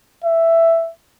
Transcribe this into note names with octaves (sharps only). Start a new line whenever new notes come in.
E5